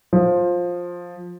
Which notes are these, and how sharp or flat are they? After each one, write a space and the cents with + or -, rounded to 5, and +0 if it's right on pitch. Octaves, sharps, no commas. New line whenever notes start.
F3 +10